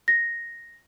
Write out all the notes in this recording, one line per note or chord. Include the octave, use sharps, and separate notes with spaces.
A#6